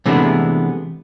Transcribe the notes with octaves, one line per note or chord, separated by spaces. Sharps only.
C3 E3 G#3 A3 B3 D4